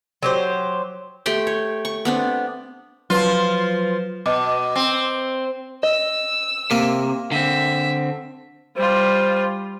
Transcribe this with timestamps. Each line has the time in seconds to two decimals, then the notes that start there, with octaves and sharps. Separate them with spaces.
0.23 F#3 G4 C5
1.26 A3 G4 G5 C6
1.47 C#5
1.85 C#6
2.05 B3 C4 D4
3.10 F3 F#3 F4 B4
4.26 B2 D#5 D6
4.75 C4
5.83 D#5 E6
6.71 C3 A#3
7.32 D3 C4 E5
8.76 G3 F4 C5